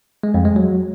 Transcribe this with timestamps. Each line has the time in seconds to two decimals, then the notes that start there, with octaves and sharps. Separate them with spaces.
0.23 G#3
0.34 F2
0.45 G#3
0.56 F#3